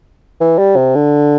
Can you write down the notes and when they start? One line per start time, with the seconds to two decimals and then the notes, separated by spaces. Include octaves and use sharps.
0.40 E3
0.58 G3
0.76 C3
0.95 D3